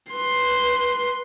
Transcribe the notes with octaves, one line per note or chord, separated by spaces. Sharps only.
B4 C6